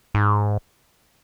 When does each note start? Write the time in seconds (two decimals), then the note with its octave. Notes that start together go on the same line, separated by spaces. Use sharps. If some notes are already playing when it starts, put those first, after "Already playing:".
0.14 G#2